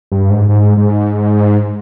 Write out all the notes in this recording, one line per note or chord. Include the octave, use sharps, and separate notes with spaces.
G2
G#2
G#2
G#2